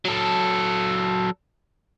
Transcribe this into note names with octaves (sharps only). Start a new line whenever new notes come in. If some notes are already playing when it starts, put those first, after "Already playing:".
F#3 A4